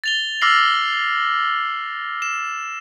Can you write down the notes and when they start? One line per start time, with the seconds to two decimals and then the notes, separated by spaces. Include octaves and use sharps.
0.04 A6 F7 G7
0.41 D6 E6 F6 A#6 C7 F#7
2.22 E7